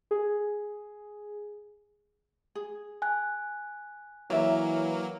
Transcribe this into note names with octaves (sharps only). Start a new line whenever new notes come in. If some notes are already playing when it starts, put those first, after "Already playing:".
G#4
G#4
G#5 F#6
E3 F#3 A#3 C#5 D5 E5